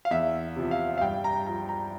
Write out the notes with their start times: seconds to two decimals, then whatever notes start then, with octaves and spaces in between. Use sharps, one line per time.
0.05 F5
0.11 E2 E5
0.56 C3 F3
0.71 F5
0.98 F5
1.01 G2 G5
1.24 A#5
1.47 F3 A#5
1.69 A#5